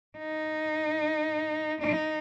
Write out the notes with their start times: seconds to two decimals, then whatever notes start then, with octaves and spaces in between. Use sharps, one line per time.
0.18 D#4
1.81 D#4